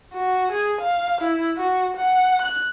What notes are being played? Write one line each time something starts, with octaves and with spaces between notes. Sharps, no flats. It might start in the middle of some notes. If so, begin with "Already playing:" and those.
F#4
G#4
F5
E4
F#4
F#5
F#6